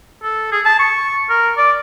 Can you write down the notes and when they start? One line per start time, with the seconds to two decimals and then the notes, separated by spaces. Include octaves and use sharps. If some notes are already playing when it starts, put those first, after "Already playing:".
0.23 A4
0.52 G#4
0.65 A5
0.79 C#6
1.29 A#4
1.57 D5